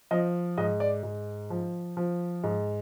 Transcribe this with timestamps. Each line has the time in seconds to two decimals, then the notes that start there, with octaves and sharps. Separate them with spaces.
0.11 F3 D#5
0.58 G#2 D#5
0.80 D5
1.03 G#2
1.50 F3
1.97 F3
2.44 G#2